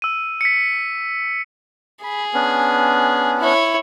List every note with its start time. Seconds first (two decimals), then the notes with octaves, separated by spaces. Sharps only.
0.02 E6 D#7
0.41 B6 C#7
2.04 G#4 B5
2.34 B3 C#4 D4
3.39 E4 C#5